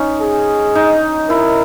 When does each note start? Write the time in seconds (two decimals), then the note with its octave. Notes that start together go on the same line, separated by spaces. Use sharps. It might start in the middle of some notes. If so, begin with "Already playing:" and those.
Already playing: C#4 D#4
0.21 G#4
0.75 D#4
1.29 E4 A#4